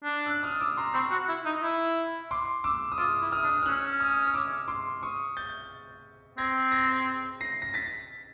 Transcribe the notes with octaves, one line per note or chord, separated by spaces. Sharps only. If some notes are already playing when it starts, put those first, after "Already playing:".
D4
E6 F#6
D#6 F6
D6 E6
A#5 C6
C4 B5 C#6
F#4
E4
D#4
E4
C6 D6
D6 E6
D#6
F4 D6 E6
E4
D#6 F6
D4
F6
C#4 E6 F#6
D#6 F6
F6
D6 E6
C6 D6
C#6 D#6
G6 A6
C4 G#6 A#6
G#6 A#6
A#6 C7
A#6
A6 B6